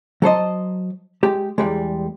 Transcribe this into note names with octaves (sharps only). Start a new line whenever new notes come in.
F#3 A4 C5 D#5
G#3 G4
E2 G3 G#3